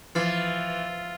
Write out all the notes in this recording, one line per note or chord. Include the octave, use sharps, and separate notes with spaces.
E3 F3 F4 F6 A6 C7